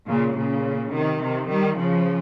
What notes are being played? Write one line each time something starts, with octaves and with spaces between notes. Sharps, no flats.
A#2 C#3
A#2 C#3
C3 D#3
C3 D#3
D#3 G3
C#3 F3